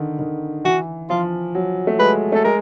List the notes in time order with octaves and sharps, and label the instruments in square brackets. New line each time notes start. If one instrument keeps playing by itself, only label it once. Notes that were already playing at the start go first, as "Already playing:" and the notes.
Already playing: [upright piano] D3 D#3
D#3
[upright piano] E3 [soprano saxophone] F#4
[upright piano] F3 [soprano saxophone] F4
[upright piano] F#3
A3
[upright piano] G#3 [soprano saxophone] B4
[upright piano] A3 [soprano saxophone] A4
[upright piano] G#3 [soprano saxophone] A#4